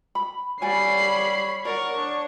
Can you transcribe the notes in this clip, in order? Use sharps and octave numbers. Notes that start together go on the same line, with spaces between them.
B5
G3 C#5 D5 F#5 G#5 B5 C7
A#4 D5 F#5 C#6
D4 C#5